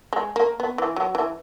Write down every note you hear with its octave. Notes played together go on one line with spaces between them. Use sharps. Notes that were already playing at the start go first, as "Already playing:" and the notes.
G#3
A#3
B3
E3
F#3
E3